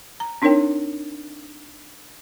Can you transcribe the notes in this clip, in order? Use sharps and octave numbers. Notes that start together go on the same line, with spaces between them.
A#5
C4 D4 D#4 A#4 C#5 G5